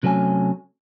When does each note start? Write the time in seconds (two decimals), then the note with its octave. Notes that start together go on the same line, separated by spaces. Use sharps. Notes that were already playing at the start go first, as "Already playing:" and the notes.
0.03 C3 F#3 A3 C#4 G#5